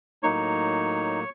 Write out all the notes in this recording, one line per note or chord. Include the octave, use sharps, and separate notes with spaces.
A2 F#3 A#3 D#4 C#5 C#6